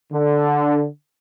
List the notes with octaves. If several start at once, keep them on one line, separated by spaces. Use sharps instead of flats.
D3